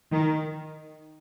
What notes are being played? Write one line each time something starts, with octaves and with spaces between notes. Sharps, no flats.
D#3